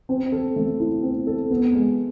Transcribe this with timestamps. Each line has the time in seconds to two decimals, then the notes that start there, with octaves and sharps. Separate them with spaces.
0.09 C4
0.32 A4
0.56 A3
0.80 E4
1.03 C4
1.27 A4
1.50 B3
1.74 G#3